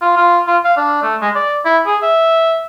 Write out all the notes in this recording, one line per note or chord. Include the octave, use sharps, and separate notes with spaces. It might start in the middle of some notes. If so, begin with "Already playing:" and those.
F4
F4
F4
F5
D4
A3
G#3
D5
E4
G#4
E5